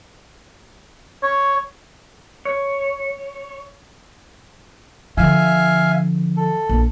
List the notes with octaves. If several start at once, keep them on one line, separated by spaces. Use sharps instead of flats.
C#5
C#5
D3 F3 E5 F5 G#5
A4
A#1